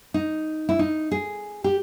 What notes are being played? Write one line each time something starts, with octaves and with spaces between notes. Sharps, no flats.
D#4
E4
D#4
G#4
G4